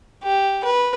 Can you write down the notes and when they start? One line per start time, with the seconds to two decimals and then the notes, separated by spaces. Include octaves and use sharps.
0.24 G4
0.64 B4